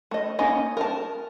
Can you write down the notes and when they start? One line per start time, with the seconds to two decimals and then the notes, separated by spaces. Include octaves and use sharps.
0.11 A3 D#5
0.39 A#3 C#4 D#4 D#5
0.77 A#4 A5